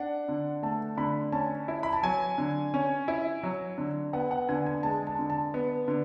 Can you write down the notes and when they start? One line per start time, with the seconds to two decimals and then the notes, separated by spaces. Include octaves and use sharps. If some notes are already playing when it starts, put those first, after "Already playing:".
Already playing: D4 F#5
0.29 D3
0.63 A3 A5
0.97 D3 B5
1.32 C#4 A5
1.68 E4
1.83 B5
1.93 A5
2.03 F#3 G#5
2.38 D3
2.74 C#4
3.08 E4
3.43 F#3
3.78 D3
4.13 B3 F#5
4.31 F#5
4.49 D3 G#5
4.66 G#5
4.83 G#3 A5
5.07 A5
5.19 D3
5.30 A5
5.54 B3
5.88 D3